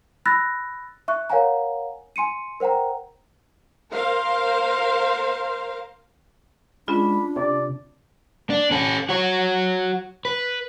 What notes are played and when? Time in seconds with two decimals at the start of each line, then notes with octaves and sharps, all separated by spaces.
0.25 B5 E6 F#6 A6 A#6
1.08 E5 C#6 F#6
1.30 A#4 C#5 F5 F#5 G#5 A#5
2.16 G#5 C6 C#7 D#7
2.60 A#4 C5 F#5 G5 A#5
3.93 A#4 C5 F5
6.88 G#3 C#4 D4 F4 B5
7.36 C3 D5
8.50 D4
8.71 C#4 A4
9.09 F#4 C#5
10.25 B4